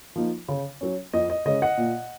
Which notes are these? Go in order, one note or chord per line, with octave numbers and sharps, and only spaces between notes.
F3 A#3 D#4
C#3
F#3 C#4
F2 D#5
D#5
C#3 G#3 C#4 D#5
D#5 F#5
A#2